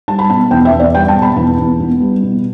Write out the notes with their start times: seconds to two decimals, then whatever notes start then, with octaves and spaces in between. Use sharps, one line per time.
0.08 G3 A5
0.19 B5
0.30 B2 A5
0.51 E2 G5
0.65 E5
0.72 E2
0.80 D5
0.94 G3 G5
1.08 A5
1.15 B2
1.22 B5
1.36 E2 A5
1.59 E2
1.80 B3
2.01 G3
2.23 B2